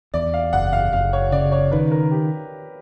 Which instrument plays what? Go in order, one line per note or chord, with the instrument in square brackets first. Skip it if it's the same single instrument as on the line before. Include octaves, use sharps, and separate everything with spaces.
[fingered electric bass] E2 [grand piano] D5
[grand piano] F5
[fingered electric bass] F#1 [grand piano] F#5
[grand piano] F5
[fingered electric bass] F#1 [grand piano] F5
[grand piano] C#5
[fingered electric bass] C#3 [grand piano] D5
[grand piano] C#5
[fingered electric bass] D#3 [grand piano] B4
[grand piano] A#4
G4